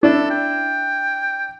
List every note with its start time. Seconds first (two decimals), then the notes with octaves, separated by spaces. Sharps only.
0.03 D4 E4 A4
0.30 G5